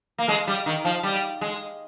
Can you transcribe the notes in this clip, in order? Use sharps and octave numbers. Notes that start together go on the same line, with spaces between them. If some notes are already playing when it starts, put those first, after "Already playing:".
A#3
G#3
G3
D#3
F3
G3
G#3